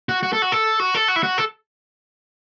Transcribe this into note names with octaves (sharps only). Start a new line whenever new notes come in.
F#4
F#4
A4
F#4
A4
F#4
A4
F#4
E4
F#4
A4